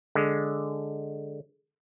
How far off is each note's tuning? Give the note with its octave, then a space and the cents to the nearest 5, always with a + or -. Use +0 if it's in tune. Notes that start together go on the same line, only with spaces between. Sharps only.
D3 +0 G#3 +0